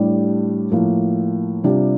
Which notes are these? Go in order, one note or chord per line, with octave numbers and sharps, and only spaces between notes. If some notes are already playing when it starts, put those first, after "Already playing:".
Already playing: A2 G3 D4 G4
A2 F3 A#3
C3 G3 D4 F4